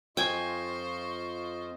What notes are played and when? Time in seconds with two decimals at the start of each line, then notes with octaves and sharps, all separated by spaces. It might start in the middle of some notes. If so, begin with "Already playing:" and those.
0.17 F2 F4 C5 D#5 G5 G#5 C#6